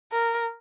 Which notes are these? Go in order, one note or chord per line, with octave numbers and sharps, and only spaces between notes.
A#4